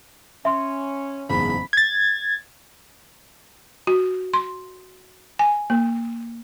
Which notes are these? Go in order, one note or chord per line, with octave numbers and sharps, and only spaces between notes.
C#4 E5 C6
F#1 E2 G#2 B5
G#6 A6
F#4
C6
G#5
A#3